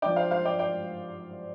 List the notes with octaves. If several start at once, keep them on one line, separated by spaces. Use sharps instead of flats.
F3 D4 D5 G5
C5 F5
C5 F5
D5 G5
D5 G5